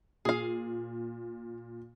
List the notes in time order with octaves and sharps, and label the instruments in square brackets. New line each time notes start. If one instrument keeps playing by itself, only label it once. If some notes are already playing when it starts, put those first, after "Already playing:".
[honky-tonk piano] A#2 [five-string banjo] G#4 F5